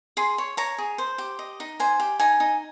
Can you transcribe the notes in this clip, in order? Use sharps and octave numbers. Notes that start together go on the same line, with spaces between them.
G#4 C6
C#5
C#5 A#5
G#4
C5
G4
D#5
D#4
C5 G#5
G4
D#4 G#5
D#4